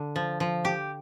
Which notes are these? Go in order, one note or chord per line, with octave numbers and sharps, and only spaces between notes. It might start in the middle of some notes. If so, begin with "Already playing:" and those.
Already playing: D3
F3
F3
G4